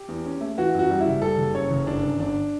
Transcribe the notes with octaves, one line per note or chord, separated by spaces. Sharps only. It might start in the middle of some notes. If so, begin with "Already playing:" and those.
Already playing: G4
E2
C#4
A3
E3 F#4
F#2 F#4
G3
E4
F#1
G3 A4
F#1
F#2 C#5
F#1
G1 D4
F#2
G1 D4